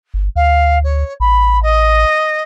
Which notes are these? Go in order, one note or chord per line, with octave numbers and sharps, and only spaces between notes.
G1
D2 F5
C#5
A1 B5
D#5